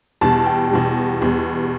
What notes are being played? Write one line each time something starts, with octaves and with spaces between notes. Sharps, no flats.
E2 B2 G3 A5
G5
E2 B2 G3
E2 B2 G3